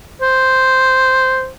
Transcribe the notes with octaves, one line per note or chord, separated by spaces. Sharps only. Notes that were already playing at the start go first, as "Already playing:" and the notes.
C5